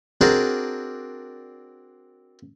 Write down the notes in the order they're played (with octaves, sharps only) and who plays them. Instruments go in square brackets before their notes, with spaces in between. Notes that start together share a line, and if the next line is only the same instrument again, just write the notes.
[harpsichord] C4 D4 F#4 G#4 A#4 D5